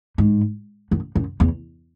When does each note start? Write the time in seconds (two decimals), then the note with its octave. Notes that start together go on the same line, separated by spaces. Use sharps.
0.18 G#2
0.91 F#2
1.15 F#2
1.40 E2